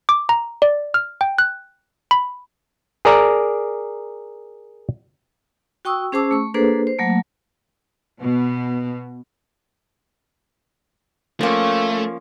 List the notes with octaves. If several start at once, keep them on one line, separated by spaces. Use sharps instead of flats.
D6
A#5
D5
F6
G5
F#6
B5
G#4 A#4 D5 A#5
F#4 G5 C#6 D#6 E6
C#4 G#4 C5 A5 D6 E6
A3 C#6
A#3 D4 G#4 A4 B4 C5
C5
F#3 A3 A#3
B2
F3 A3 A#3 C#4 C#6